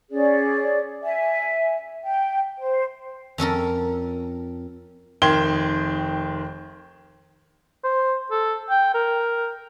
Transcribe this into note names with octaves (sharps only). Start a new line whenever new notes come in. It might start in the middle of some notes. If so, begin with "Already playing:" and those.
C#4 G#4 D5
E5 G#5
G5
C5
F2 C#4 A4 A#4
F1 D#3 G5 C6 G#6 G7
C5
A4
G5
A#4